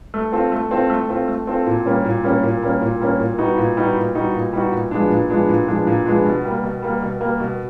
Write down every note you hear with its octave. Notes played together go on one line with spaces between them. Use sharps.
A3
C4 F4 A4
A3
C4 F4 A4
A3
C4 F4 A4
A3
C4 F4 A4
A#2
G3 A#3 C#4
A#2
G3 A#3 C#4
A#2
G3 A#3 C#4
A#2
G3 A#3 C#4
A#2
G3 B3 D#4 F#4
A#2
G3 B3 D#4 F#4
A#2
G3 B3 D#4 F#4
A#2
G3 B3 D#4 F#4
A#2
F3 G#3 B3 D4
A#2
F3 G#3 B3 D4
A#2
F3 G#3 B3 D4
A#2
F3 G#3 B3 D4
B2
G3 A#3
B2
G3 A#3
B2
G3 A#3
B2